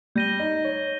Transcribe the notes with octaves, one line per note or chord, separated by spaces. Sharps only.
G3 G6 A#6 D#7 G7
D#4
C#5